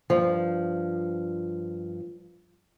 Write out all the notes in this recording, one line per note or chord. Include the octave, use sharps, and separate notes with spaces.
G2 F3